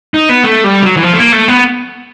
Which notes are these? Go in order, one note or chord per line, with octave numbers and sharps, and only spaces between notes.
D#4
B3
A3
G3
F#3
E3
F3
A3
A#3
A3
B3